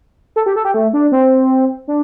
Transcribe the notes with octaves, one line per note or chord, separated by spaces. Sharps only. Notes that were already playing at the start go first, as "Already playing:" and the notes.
A4
G4
A4
G4
A3
D4
C4
D4